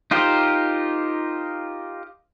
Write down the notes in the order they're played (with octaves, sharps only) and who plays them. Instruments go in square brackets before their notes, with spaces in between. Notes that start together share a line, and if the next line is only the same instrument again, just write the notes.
[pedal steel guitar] D#4 F4 G4 A#4 C5